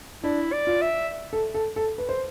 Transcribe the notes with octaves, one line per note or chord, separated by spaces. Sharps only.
D4 E4
D5
F4
E5
A4
A4
A4
B4
C5